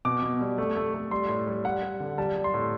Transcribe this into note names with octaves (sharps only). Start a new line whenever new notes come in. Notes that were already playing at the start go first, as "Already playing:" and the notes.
B2 D6
B2
G3
A3
A3
A3
G3 C6
A2
G3
G3 F#5
G3
D3
G3 A5
G3
C6
A2